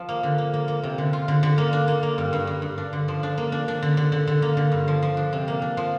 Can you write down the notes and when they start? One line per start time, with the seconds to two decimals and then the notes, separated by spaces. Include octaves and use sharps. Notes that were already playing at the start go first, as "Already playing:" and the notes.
Already playing: F3
0.09 A#3
0.23 D3
0.38 A#3
0.53 A#3
0.68 A#3
0.83 C3
0.98 D3
1.13 F4
1.28 D3
1.43 D3
1.58 A#3
1.73 D4
1.88 A#3
2.03 A#3
2.18 G2
2.33 G2
2.47 G2
2.62 G2
2.78 D4
2.93 D3
3.08 F3
3.23 D4
3.38 A#3
3.52 D4
3.68 D4
3.82 D3
3.97 D3
4.12 D3
4.27 D3
4.42 A#3
4.57 D3
4.72 G2
4.88 F3
5.03 F3
5.17 D4
5.33 C3
5.48 A#3
5.62 D4
5.77 F3